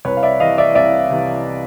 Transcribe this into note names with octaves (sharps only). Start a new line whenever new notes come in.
C2 B4 C#5
F5
D5 E5
C3 E3 D#5 F5
D5 E5
C2 D5 E5
C3 E3